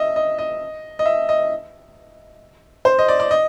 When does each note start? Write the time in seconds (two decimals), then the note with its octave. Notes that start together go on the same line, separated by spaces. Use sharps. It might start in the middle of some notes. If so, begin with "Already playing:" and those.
Already playing: D#5 E5
0.16 D#5
0.38 D#5
0.99 D#5
1.06 E5
1.29 D#5
2.85 C5
2.99 D#5
3.08 D5
3.20 D5
3.31 D#5